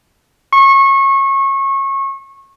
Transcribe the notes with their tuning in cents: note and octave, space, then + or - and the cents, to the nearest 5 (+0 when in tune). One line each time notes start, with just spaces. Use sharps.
C#6 -25